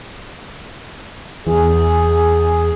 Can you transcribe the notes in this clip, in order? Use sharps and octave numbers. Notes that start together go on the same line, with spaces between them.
E2 G#4